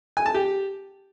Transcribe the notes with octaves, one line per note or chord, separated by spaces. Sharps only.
G#5
A5
G4